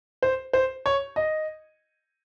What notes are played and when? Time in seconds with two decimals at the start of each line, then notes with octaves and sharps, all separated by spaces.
0.23 C5
0.53 C5
0.86 C#5
1.16 D#5